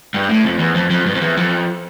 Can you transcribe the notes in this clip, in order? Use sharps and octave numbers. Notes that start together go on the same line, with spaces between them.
G2
A2
F2
E2
F2
F2
G2
F2
E2
F2